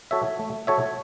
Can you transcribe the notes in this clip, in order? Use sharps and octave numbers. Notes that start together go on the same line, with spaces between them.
F#4 A4 C#5 E5
A3
F#4 A4 C#5 E5